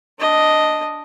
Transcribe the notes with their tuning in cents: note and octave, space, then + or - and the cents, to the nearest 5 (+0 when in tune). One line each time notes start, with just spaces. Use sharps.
D4 +0 D#5 +0